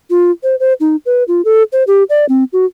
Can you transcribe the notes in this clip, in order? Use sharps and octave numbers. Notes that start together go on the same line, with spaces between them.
F4
C5
C5
D#4
B4
F4
A4
C5
G4
D5
C4
F#4